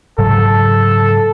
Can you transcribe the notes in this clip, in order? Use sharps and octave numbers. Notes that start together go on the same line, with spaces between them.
G#2 C#3 F#3 A4